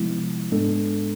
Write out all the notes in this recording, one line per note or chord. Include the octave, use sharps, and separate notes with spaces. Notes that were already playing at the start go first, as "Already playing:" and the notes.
Already playing: C3 F3 G#3 B3 E4
G#2 G#3 B3 D4 A4